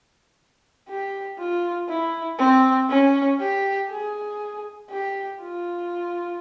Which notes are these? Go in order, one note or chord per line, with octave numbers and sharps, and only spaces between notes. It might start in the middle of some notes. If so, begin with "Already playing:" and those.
G4
F4
E4
C4
C#4
G4
G#4
G4
F4